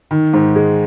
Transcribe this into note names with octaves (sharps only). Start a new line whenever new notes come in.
D#3
G#2
G#3